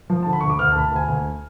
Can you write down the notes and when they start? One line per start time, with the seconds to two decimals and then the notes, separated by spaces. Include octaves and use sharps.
0.10 F3
0.23 D3 A5
0.33 B5
0.41 D2 C#6
0.50 D6
0.59 D2 F6
0.72 A5
0.75 D2 B5
0.84 A5
0.92 D2 G#5
1.09 D2